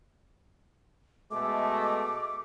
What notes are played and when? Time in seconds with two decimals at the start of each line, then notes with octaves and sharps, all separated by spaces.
1.31 B2 G#3 A3 D6